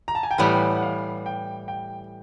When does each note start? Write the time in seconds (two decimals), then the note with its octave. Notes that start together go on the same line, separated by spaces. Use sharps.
0.08 A#5
0.15 A5
0.23 G#5
0.31 G5
0.38 A2 E3 G3 B3 F#5
0.76 F#5
0.83 F5
1.26 G5
1.68 G5